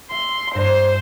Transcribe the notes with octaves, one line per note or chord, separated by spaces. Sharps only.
E5 C6
G2 C5 A#6 E7